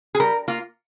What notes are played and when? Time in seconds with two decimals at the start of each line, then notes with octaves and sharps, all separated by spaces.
0.15 G#4
0.20 G3 A#4
0.48 A#3 F4